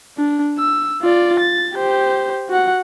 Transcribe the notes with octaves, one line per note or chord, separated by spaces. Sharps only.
D4
E6
F4 D5
A6
G4 C5
F#4 F#5